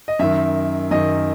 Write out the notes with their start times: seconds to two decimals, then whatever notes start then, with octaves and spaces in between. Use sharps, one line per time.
0.08 D#5
0.19 F#2 D#3 E5
0.91 F#2 D#3 D#5